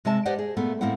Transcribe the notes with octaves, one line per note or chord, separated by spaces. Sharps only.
C3 G#3 D#5 E5 A5
G4 B4 C5 D5 D#5 F#5
G#4
A#2 A3 B3
A2 A#3 C4 E4 F#5